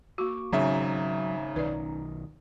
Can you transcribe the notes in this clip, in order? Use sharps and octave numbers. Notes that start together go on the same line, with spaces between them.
A#3 F#4 C#6 D6
G#1 C#3 F#3 C#4 D#4 E5 A#5
B1 D#3 B4 D5